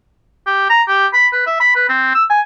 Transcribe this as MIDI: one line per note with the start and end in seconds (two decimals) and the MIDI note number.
0.47 0.66 67
0.69 0.82 82
0.88 1.07 67
1.13 1.27 83
1.33 1.46 71
1.47 1.58 76
1.60 1.74 83
1.76 1.88 71
1.89 2.13 60
2.14 2.24 88
2.30 2.41 80